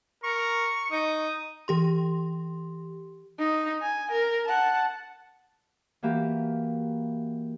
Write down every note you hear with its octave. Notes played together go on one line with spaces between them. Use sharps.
A#4 C#6
D#4 D#6
E3 G4 C6
D#4
G#5
A#4
F#5 A5
E3 A#3 F#4 G4